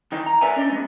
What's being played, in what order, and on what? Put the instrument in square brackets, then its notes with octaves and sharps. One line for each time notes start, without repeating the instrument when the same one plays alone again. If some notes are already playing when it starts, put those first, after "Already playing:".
[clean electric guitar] D#3 E3 D#4
A#5
A#4 B4 D5 E5 G#5 A#5
C#4 D4 D#5
G#2 A3 B3